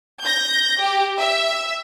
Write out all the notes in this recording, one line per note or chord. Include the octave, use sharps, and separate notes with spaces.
G6 A#6
G4
E5